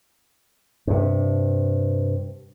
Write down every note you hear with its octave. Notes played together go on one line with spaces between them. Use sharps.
G2 C3